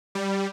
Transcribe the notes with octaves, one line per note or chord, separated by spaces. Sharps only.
G3